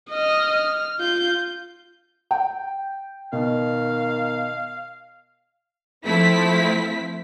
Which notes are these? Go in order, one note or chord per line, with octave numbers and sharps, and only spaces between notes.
D#5 F6
F6
F4 G6
G5
B2 D#3 F5
F3 A3 C4 E4 B6